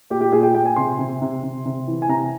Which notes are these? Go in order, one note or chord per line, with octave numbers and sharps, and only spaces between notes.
A#2 G4
G4
A#2 G#4
G5
A#2 G5
G#5
C3 C6
C3
C3
C3
C3
E3
G#5
C3 A#5